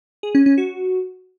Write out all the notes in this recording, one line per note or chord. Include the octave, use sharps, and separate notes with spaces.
G#4
C#4
C#4
F#4